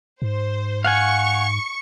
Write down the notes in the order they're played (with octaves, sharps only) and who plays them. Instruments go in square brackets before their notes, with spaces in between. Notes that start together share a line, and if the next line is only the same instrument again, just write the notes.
[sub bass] G#2 [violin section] C5
[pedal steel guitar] F5 F#5 G#5 [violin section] C#6